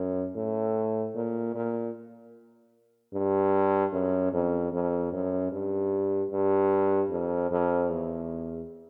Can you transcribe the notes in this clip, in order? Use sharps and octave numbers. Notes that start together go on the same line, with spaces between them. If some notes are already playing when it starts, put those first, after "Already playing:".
Already playing: F#2
A2
A#2
A#2
G2
F#2
F2
F2
F#2
G2
G2
F2
F2
E2